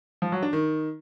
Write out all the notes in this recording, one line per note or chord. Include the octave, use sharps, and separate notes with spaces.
F3
F#3
D4
D#3